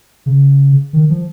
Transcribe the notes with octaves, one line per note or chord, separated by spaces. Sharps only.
C#3
D#3
F3